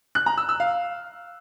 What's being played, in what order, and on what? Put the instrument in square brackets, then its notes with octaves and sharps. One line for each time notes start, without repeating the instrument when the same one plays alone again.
[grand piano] F#6
A#5
E6
E6
F5